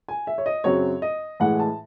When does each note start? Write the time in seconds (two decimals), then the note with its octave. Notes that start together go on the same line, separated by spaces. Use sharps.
0.08 G#5
0.27 E5
0.38 C#5
0.46 D#5
0.64 F#2 C#3 F#3 C4 C#5
1.02 D#5
1.40 A2 E3 G#3 F#5
1.59 A5